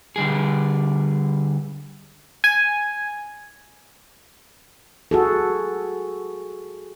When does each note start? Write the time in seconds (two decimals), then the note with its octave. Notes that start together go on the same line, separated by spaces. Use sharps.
0.16 D3 G3 G#4
2.44 G#5
5.11 F#4 G#4 A4